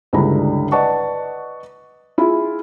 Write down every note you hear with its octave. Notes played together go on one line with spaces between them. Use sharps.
C#2 G2 D3 E4 A#5 B5
B4 D5 D#5 F#5 A5 C#6
E4 F4 G#4